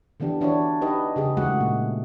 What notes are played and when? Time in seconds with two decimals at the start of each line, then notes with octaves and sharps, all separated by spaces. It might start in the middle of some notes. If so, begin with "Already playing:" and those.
0.20 D3 E3 B3 D4 G4
0.41 E3 D4 E4 F#4 C#5
0.81 D#4 G4 B4 D#5
1.16 C#3 G4 G#4
1.37 E3 G#3 A3 F#4 F#5
1.60 A#2